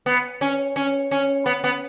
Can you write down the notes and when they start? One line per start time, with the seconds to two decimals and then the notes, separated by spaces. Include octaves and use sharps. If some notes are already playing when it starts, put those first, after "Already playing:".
0.06 B3
0.41 C#4
0.76 C#4
1.11 C#4
1.46 B3
1.64 B3